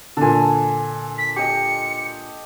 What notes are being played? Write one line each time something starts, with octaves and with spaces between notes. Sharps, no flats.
A#2 D3 A4 G#5
B6
G4 D#5 C#7